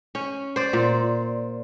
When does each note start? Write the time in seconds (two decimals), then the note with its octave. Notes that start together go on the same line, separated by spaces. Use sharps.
0.15 C#4
0.56 C5 D5
0.73 A#2